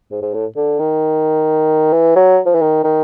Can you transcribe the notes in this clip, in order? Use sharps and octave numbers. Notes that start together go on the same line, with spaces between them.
G#2
G#2
A2
D3
D#3
E3
F#3
F3
E3
D#3
D#3